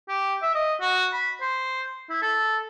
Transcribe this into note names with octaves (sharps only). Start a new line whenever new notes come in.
G4
E5
D#5
F#4
B5
C5
E4
A4